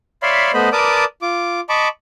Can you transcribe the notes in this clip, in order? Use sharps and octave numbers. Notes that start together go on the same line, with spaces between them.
C#5 D5 E5 F5 B5 C6
A3 B3 C5 D#5 B5
A#4 B4 D5 A5 D6 D#6
F4 D6
D#5 A5 B5 C#6 D6